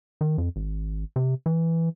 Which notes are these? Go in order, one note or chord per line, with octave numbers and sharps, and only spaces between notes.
D#3
F2
G#1
C3
E3